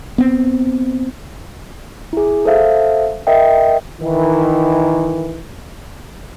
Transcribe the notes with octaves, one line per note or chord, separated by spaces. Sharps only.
B3 C4
E4 G#4
A4 C5 E5 F5
A#4 D#5 E5 G5
D#3 E3